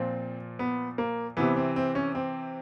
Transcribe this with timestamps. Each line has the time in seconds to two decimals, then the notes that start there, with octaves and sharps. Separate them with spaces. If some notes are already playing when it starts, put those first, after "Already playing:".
Already playing: A#2 F3 C4
0.59 B3
0.98 A#3
1.37 C3 E3 B3
1.56 C4
1.76 C4
1.95 C#4
2.15 C4